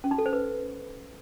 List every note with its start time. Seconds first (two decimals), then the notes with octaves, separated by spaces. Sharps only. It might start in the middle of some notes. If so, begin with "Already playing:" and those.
0.04 C#4
0.11 D#4
0.18 A4
0.26 C5
0.33 B4